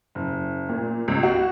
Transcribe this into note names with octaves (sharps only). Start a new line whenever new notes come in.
F#1
A#2
C#2
F#4